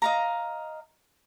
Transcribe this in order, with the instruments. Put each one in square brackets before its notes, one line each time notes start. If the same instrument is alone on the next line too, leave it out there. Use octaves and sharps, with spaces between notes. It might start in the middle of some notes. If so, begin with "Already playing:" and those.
[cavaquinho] D#5 F5 A#5